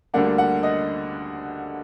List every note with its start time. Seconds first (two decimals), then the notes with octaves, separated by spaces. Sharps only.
0.14 D2 D3 G3 A#3 D4 F#5
0.38 F#5
0.63 D#5